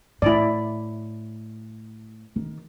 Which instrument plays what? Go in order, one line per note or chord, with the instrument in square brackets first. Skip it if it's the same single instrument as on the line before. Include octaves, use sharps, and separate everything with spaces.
[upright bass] A2 [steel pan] E4 D5
[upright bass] D#3